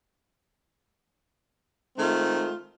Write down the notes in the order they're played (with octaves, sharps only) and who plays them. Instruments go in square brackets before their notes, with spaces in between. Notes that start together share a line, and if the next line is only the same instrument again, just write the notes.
[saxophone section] D#3 G#3 A3 C4 F4